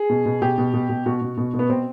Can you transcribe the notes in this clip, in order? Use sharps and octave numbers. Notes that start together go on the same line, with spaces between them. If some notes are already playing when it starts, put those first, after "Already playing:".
Already playing: G#4
B2
B2
B2 G4
B2
B2
B2
B2 F#4
B2
B2
B2
B3
B2 C4